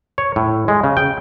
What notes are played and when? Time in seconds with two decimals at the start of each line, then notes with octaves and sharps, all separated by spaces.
0.18 C#5
0.36 A2
0.68 G#3
0.84 C#3
0.97 G5